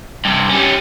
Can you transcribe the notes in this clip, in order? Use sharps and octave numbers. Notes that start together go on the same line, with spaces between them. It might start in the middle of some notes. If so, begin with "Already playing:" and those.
G2 C3
G3 C#4